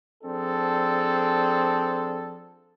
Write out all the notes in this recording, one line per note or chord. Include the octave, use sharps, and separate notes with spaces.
F3 C4 D4 G#4 A4